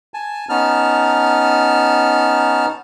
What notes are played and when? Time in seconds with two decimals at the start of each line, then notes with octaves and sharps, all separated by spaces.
0.14 G#5 A5
0.49 B3 C#4 D#4 A5 F6